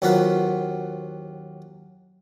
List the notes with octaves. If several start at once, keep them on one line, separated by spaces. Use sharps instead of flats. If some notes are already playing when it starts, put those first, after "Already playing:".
D#2 F#3 C4 F4 F#4 B4